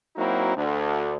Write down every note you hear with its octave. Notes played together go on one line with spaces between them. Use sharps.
F#3 A#3 C4 D#4 E4 F#4
D2